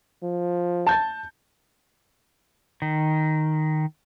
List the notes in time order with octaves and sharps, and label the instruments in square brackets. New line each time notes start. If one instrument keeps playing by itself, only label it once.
[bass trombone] F3
[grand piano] A5 G6 A6
[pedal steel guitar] D#3